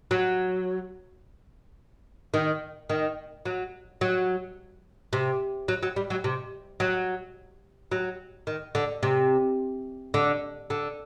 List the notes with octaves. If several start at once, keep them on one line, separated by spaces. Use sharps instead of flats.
F#3
D#3
D#3
F#3
F#3
C3
F#3
F#3
G3
F#3
C3
F#3
F#3
D#3
D3
C3
D3
D3